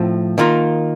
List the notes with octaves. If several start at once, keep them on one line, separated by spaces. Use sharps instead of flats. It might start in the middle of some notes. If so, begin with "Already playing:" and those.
Already playing: A2 F3 C4 F4
D#3 A#3 F4 A#4